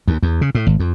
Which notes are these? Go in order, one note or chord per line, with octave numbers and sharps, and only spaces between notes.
D#2
E2
C#3
A2
G#1
F2